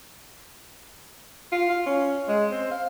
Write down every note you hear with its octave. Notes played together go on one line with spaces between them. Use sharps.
F4
F4
C#4
G#3
C4
F5